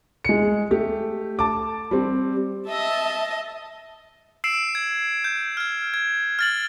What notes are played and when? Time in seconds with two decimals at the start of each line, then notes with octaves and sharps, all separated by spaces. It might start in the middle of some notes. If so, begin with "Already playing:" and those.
0.25 G#3 C#7
0.71 A3 G4
1.39 A5 D6
1.91 G3 C4
2.67 D#5 E5 A5
4.44 E6 C7 D7 E7
4.75 G#6
5.24 G6
5.57 F6 G#6
5.94 G#6
6.39 F6 A6 F#7